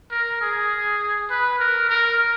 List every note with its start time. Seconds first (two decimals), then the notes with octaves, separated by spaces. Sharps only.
0.11 A#4
0.41 G#4
1.30 B4
1.59 A#4
1.89 A#4